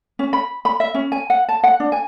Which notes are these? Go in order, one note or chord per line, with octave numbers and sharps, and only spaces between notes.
C#4
B5
B5
E5
C#4
G#5
F#5
A5
F#5
D4
G#5